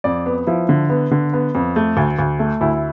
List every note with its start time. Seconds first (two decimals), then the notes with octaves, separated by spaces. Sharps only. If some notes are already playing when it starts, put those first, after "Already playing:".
0.04 F2 D5
0.26 B3
0.47 F3 E4
0.69 D3
0.89 B3
1.11 D3
1.33 B3
1.55 F2
1.76 A3
1.97 D2
2.19 D2
2.39 A3
2.61 D2 E4